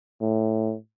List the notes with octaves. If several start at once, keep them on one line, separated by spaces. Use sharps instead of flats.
A2